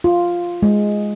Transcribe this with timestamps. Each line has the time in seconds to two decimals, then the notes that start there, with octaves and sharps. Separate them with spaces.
0.04 F4
0.63 G#3